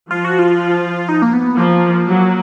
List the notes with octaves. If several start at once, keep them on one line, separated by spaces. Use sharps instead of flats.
F3 F4
F#4
F4
D#4
A#3
B3
F3 A#3
F#3